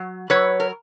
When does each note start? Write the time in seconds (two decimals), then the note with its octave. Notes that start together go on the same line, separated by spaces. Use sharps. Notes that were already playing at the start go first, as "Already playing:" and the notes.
Already playing: F#3
0.30 F#3 B4 C#5
0.60 A#4